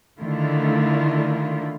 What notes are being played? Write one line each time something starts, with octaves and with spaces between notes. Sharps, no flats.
D3 D#3 A3 E4 F4